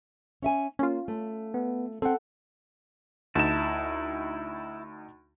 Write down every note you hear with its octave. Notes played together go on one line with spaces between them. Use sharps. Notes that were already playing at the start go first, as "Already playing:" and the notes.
C#4 E5 G#5
A#3 C#4 F4
A3
B3
C4 A4 F#5 G5
D2 D#4 E4 A5 E7